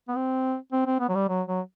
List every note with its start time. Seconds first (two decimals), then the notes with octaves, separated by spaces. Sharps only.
0.08 B3
0.16 C4
0.72 C4
0.86 C4
1.00 B3
1.09 F#3
1.15 G3
1.29 F#3
1.47 F#3